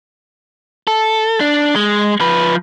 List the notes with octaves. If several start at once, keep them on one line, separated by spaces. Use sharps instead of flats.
A4
D4
G#3
F3 B4